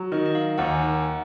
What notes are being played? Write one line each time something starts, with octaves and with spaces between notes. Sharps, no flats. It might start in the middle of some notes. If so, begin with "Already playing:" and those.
Already playing: F#3
D#3 D#5
D#5
F5
D#2 F#5
G#5
F#5